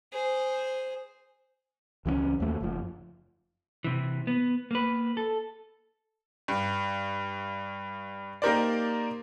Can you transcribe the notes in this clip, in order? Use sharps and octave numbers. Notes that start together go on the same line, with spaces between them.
G#4 C5
C#2 E3 A3 C#4
D#2 A3
F#1 F3
C3 E3
B3
A#3 B4
A4
G2
A#3 D#4 G4 A#4 C5 D5